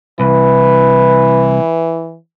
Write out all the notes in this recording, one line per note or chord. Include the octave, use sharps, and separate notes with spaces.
C2 E3 B4